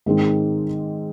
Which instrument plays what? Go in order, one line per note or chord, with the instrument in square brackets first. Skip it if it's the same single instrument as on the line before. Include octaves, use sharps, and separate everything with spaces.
[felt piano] G#2 D#3 G#3 C4 D#4